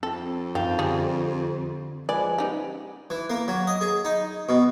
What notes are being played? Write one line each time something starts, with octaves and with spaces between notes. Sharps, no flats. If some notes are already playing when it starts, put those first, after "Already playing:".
F2 C4 A4
F#2 D#3 F3 F5 G5 A5
D3 G3 G#4
F3 G#3 B4 D5 G#5 B5
G3 B3 C#4 D#4 G4
E3
A#3
F#3
D#5
G#4
D#4
B2